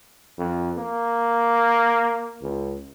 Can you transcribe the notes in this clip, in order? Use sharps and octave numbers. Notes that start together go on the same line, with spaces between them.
F2
A#3
C#2